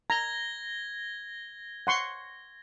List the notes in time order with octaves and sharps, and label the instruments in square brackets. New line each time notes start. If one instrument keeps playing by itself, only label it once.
[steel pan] A#5 [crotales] G#6 A#6 G7
[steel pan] F#5 C6 C#6